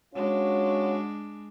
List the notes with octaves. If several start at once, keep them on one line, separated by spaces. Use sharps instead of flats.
G#3 C#4 D4 F4 F#4